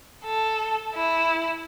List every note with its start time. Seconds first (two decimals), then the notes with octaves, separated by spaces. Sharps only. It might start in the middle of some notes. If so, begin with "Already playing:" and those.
0.25 A4
0.95 E4